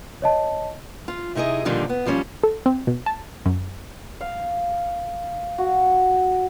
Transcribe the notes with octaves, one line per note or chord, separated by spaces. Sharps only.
C#5 D#5 A5
F4
C3 D#4 E4 G#4 D#5
A#2 D3 D#3 F3 G3
B3
D#2 F3 G3 C#4
A4
C4
B2
A5
F#2
F5
F#4